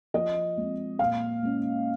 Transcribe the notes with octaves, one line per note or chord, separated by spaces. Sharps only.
F3 D#5
G#3 C4
A#2 F5
G#3 C#4